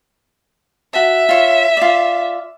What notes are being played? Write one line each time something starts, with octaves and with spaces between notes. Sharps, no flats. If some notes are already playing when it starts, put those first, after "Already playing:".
F#4 E5 A5
F4 C#5
F4 D5